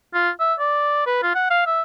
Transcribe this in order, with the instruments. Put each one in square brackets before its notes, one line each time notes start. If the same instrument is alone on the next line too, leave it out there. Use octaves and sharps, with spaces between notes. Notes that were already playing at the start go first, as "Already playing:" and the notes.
[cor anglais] F4
E5
D5
B4
F4
F#5
F5
E5